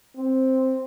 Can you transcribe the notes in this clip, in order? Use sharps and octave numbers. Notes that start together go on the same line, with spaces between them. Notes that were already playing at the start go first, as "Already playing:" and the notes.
C4